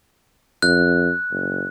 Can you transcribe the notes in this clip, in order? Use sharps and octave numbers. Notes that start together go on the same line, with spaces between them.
F2 F#6
F#1